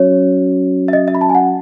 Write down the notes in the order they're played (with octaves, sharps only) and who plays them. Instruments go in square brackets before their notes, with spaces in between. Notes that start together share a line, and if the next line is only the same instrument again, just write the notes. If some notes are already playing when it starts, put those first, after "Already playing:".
Already playing: [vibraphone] F#3 C#4 F#4 [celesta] C#5
[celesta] E5
D#5
E5
B5
A5
G#5
F#5